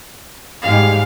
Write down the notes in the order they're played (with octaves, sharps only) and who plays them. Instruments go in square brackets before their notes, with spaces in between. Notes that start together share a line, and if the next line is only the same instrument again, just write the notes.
[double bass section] G#2 G3 G#3 [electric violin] F5